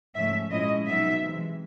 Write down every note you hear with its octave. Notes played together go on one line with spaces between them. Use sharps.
G#2 F3 A3 C#4 E5
A#2 F3 G#3 C#4 E4 D#5
B2 F#3 B3 D#4 E5
C3 E3 G#3